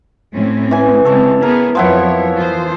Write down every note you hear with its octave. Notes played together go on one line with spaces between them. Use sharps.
A2 C4 C#4
E3 G#5
C#3 G#3 C4 A4 C#5
B3 G#4 A#4
F2 F3 F#3 B3 E4 C#5
E3 F4 C5